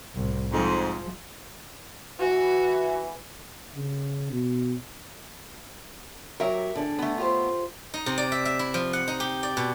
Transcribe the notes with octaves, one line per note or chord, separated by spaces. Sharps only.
C2 A2
F2 G#2 F3 G#3
E3 F#4
C#3
B2
F#3 G4 A#4 E5
D3 G#4
A3 B3
F4 G4 C5
D#4
C3
D5
E5
E5
E4
F3
F#5
D#4
G4
D5
B2